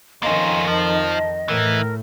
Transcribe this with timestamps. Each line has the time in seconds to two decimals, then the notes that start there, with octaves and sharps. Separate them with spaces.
0.23 F2 D#3 A#3 C#4 D#5 C6
0.67 F3 A5
1.48 A2 E3 A#4